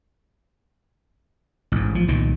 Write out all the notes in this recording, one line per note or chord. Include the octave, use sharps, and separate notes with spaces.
A1 G#2
F3
C2 A#2 D#3